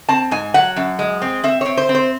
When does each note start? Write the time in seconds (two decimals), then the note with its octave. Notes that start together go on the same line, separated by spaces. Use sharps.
0.09 C4 A5
0.31 G#2 G#5
0.54 F#3 F#5
0.77 F#2
0.99 G#3
1.22 C4
1.44 C4 E5
1.61 C4 C#5
1.77 C5
1.89 C4
1.95 C5